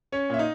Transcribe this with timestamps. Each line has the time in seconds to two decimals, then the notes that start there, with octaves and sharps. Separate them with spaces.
0.12 C#4 C#5
0.30 A#2 E5
0.38 D#4 D#5